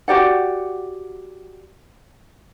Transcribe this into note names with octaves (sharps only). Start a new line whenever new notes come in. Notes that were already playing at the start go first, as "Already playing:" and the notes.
F#4 G4 D5 F#5